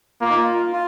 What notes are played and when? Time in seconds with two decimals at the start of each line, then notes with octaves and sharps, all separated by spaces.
0.21 A#3 F4
0.29 D#4
0.37 F4
0.73 F4